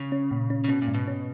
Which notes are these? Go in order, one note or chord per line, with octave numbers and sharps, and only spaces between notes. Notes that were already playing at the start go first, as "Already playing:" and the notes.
Already playing: C#3
C#4
A#2
C#4
C#3
B2 C#4
A#2
G#2
B2
C#4